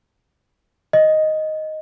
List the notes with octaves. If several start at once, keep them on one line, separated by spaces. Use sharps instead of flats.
D#5